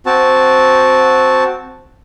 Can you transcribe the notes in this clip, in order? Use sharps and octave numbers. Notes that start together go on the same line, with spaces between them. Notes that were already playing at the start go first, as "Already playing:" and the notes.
C4 F#4 A5